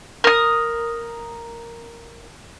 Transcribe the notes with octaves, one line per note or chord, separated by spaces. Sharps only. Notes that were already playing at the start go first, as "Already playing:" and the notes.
A#4 D#6